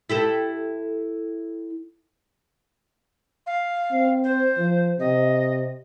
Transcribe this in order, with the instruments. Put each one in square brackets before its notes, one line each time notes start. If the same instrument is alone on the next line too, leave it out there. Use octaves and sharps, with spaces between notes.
[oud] E4 G4 A4
[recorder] F5
[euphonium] C4
[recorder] C5
[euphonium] F3
[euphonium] C3 [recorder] D#5